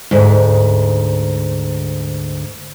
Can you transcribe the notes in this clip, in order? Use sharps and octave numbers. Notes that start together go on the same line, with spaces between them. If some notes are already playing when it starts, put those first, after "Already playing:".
D2 G#2